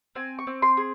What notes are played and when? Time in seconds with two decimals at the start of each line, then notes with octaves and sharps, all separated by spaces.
0.15 C4 G#5
0.39 C#6
0.47 C4
0.62 C6
0.77 G#4